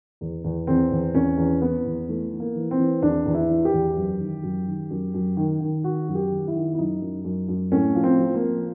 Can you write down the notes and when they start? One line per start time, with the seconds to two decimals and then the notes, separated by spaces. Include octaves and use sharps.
0.21 E2
0.44 E2
0.67 E2 C4
0.91 E2
1.14 E2 C#4
1.38 E2
1.61 E3 B3
1.85 E2
2.08 E3 A3
2.32 E3
2.40 A#3
2.55 E3
2.71 C4
2.79 E3
3.02 E2 D4
3.26 E2
3.34 E4
3.50 E3
3.65 G4
3.73 E2
3.97 F#2
4.20 D#3
4.43 F#2
4.67 D#3
4.90 F#2
5.14 F#2
5.37 D#3
5.60 D#3
5.84 D#3 F#4
6.08 F#2
6.15 G4
6.31 D#3
6.47 E4
6.55 D#3
6.73 E4
6.78 F#2 D#4
7.02 F#2
7.25 F#2
7.48 F#2
7.72 A2 C#4
7.95 F3
8.03 C4
8.19 F3
8.35 A#3
8.43 F3